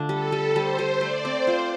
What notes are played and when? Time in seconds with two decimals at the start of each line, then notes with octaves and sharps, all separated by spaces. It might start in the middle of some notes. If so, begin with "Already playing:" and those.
Already playing: D3 A3 D4 F4
0.09 G3 A4
0.32 G3
0.55 G3 C5
0.79 G3
1.01 A3 D5
1.25 C4
1.32 C5
1.47 F4